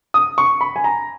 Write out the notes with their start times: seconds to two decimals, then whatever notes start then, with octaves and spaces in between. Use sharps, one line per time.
0.14 D#6
0.38 C#6
0.61 B5
0.76 G#5
0.84 A#5